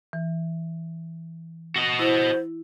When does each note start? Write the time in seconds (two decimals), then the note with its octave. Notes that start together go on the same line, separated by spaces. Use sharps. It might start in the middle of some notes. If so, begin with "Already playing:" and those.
0.13 E3
1.76 F#4 D#5
1.99 E4 C5